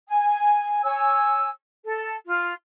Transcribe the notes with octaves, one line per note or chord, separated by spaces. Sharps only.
G#5
C#5 G#5 E6
A4
F4